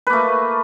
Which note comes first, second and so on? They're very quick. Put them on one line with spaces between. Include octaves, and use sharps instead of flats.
B4 A#3 A3